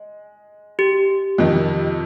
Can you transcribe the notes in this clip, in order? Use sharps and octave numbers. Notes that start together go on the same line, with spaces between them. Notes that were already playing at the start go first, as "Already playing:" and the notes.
Already playing: G#3
G4
F2 C3 D#3